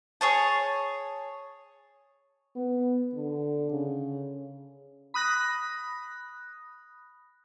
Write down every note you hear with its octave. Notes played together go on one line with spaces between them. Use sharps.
G#4 C#5 A5
B3
D3
C#3
B5 D#6 F#6 A#6